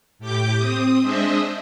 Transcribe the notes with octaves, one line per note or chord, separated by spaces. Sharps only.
A2 G4 D6 G6
C4 D#6
G#3 D4 C5 D#5 E5